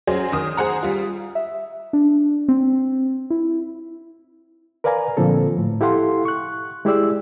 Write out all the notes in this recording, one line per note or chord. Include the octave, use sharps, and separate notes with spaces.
F#3 C#4 G#4 C5
D#3 D#6
G#4 C5 F#5 A#5
G3 F4
E5
D4
C4
E4
A#4 B4 D5 F5 G#5 A#5
A#2 D3 F3 C4 A4
A2
E4 G4 A4 F5 F#5 C6
C#6 F#6
G#3 E4 G4 G#4 D5 E6